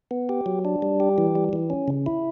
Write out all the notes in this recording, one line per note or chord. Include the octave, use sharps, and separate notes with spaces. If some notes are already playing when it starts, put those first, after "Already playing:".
B3
G4
F#3
D4
G3
G4
E3
G3
E3
C#4
C#3
E4